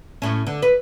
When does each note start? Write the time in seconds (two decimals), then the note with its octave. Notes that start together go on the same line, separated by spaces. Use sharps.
0.22 A2 C#4
0.47 D3
0.62 B4